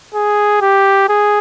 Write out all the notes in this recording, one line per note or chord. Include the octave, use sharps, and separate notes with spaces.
G#4
G4
G#4